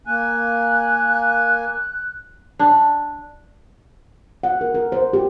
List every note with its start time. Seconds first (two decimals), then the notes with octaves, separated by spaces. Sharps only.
0.07 A#3 G#5 F#6
2.59 D4
4.43 F#5
4.61 A#4
4.75 A#4
4.92 C5
5.13 G4